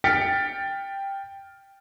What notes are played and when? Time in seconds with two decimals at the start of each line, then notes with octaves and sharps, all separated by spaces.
0.04 G5 F6 A6 B6 C#7 D7